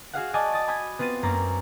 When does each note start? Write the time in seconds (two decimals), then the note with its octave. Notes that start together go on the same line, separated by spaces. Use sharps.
0.13 F#4 G#4 F5 F#5
0.34 D5 D#5 F#5 G#5 A5 C#6
0.52 D#6 A6 D7
0.67 G#5 B5 D#6 G6 G#6
0.99 B3 C4 F4 A6 D#7
1.23 F#2 A#3 A#5 A6